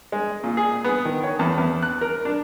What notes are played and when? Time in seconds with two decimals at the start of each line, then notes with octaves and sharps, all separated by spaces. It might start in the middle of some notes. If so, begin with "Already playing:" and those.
0.12 G#3
0.44 A#2
0.57 G#4
0.84 B3
1.05 D#3
1.23 C#5
1.39 E2
1.58 E2
1.82 F#6
2.01 A#4
2.25 D4